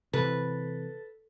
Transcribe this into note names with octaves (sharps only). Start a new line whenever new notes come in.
C3 E3 A4 B4